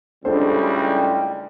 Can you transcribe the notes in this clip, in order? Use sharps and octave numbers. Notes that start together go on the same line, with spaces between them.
C#2 A2 G3 D4 A4 C5